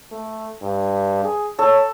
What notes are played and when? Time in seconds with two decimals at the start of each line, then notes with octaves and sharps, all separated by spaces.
0.11 A3
0.62 G2
1.24 G#4
1.59 A4 C#5